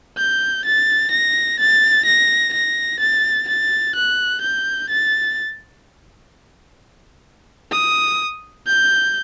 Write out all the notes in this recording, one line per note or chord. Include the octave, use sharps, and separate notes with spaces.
G6
A6
A#6
A6
A#6
A#6
A6
A6
F#6
G6
A6
D#6
G6